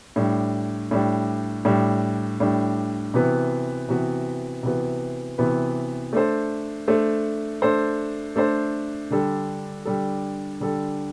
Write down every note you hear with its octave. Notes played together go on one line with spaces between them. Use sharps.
A2 G3 D4
A2 G3 D4
A2 G3 D4
A2 G3 D4
C3 E3 B3 F#4 B4
C3 E3 B3 F#4 B4
C3 E3 B3 F#4 B4
C3 E3 B3 F#4 B4
A3 D4 A4 C5
A3 D4 A4 C5
A3 D4 A4 C5
A3 D4 A4 C5
D3 G3 D4 A4
D3 G3 D4 A4
D3 G3 D4 A4